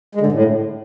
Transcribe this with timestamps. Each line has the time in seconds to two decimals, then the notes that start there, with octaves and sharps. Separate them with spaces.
0.15 G#3
0.21 D3
0.26 G#2
0.32 A2